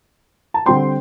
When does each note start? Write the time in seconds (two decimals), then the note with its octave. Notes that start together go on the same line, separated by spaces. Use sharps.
0.54 A5
0.66 D3 G3 C4 G5 C6